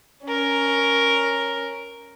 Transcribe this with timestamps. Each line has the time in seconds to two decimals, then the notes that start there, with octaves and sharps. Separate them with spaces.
0.24 C#4 A#4